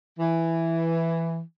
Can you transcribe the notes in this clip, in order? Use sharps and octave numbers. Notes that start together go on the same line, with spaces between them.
E3